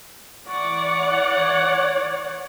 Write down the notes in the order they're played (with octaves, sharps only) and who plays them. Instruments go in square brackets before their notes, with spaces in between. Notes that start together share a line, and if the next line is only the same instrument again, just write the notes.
[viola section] E3 D5 F#5 [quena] C#6
[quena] C#5